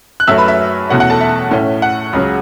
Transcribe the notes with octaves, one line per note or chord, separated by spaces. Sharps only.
F#6
F#2 F#3 A3 E5 E6
B4 B5
E5
E2 B2 A3 C#4 F#5
F#5
A4 A5
E5
A2 A3 C#4
F#5
C#2 C#3 F#3